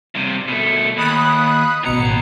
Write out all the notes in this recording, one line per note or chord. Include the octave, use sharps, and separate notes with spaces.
G2 C3
B2 A3
D#2 B5 D#6 F#6
A1 D#2 B2 A#5 C#7